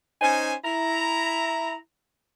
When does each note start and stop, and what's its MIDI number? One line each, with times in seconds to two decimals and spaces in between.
0.22 0.54 61
0.22 0.54 63
0.22 0.54 72
0.22 0.54 80
0.64 1.75 64
0.64 1.75 82